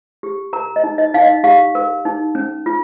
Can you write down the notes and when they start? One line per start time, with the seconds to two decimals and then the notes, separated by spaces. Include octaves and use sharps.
0.23 G4
0.53 A#4 A#5
0.76 D#5
0.84 D#4
0.98 D#5
1.14 D#4 F5
1.21 D#5
1.44 G4 F5
1.75 A#4
2.05 D#4
2.35 C#4
2.66 F4